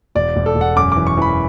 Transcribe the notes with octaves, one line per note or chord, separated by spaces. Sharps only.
E1 D5
E1
A4
E1
F#5
F#2 D6
E3 D6
C#6
E3 B5